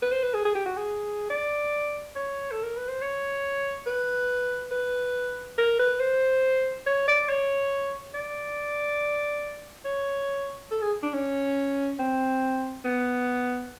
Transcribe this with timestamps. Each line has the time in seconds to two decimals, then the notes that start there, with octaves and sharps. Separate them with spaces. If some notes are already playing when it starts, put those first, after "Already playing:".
0.02 B4
0.12 C5
0.23 B4
0.34 G#4
0.45 G#4
0.55 G4
0.66 F#4
0.77 G#4
1.30 D5
2.16 C#5
2.51 A4
2.63 A#4
2.77 B4
2.89 C5
3.01 C#5
3.87 B4
4.71 B4
5.58 A#4
5.79 B4
6.00 C5
6.86 C#5
7.08 D5
7.29 C#5
8.14 D5
9.85 C#5
10.71 A4
10.82 G#4
11.03 D4
11.14 C#4
11.99 C4
12.84 B3